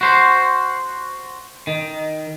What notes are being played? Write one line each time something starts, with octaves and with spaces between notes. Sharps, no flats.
F#4 C5
D#3